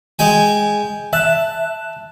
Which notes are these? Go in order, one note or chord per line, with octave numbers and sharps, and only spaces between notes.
G#3 G5 G#5
E5 A5 F#6